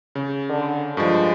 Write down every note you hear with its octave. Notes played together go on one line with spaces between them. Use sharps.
C#3
D3
G2 F3 G#3